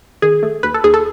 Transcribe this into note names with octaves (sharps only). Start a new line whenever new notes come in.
D#3 G#4
A3
D#2 B4
A4
D#2 G#4
A4